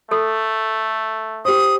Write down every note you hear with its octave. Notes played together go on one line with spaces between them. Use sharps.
A3 A4
G4 C5 D#6